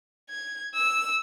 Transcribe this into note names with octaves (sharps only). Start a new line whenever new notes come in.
G#6
E6